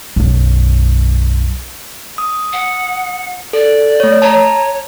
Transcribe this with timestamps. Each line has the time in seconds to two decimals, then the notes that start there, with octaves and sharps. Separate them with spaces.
0.16 B1 F#2
2.18 D#6
2.53 F#5
3.53 A4 D5
4.00 A3 C#5
4.22 C#5 A5 A#5